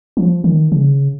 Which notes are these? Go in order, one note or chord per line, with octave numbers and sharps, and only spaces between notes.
F3
D#3
C#3